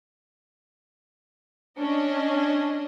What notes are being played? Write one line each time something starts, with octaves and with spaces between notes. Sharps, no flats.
C#4 D4 D#5